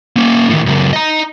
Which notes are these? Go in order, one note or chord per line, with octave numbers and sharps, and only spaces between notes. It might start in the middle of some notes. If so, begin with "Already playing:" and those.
A#3 C#4
A2 D#3
C#2 F#2
D#5 A#5